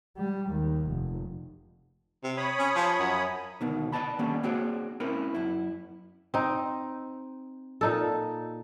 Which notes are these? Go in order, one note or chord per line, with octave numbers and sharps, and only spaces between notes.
G3
D#2
F1
C3
C#5 B5 D#6
C#4
F3
F#2
D2 B2 D#3
B4 D5 D#5 A5 B5
D3 D#3 G3 A#3 B3 C#4
A#3 C4 F#4 G#4 C#5 D5
C4 C#4 E4 A#4 B4
F#2 E4
C4 D#4
A#2 D#4 A4